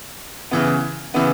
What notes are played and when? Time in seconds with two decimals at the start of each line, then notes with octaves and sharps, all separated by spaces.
0.51 C#3 E3 B3
1.14 C#3 E3 B3